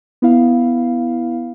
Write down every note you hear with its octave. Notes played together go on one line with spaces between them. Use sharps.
B3 E4 F5